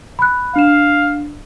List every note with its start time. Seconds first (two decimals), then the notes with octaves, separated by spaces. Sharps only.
0.19 B5 F#6
0.56 D4 F5 E7